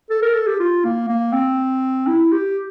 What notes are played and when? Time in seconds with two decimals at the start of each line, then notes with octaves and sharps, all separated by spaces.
0.10 A4
0.22 A#4
0.34 A4
0.47 G4
0.60 F4
0.84 A#3
1.09 A#3
1.33 C4
2.07 E4
2.32 G4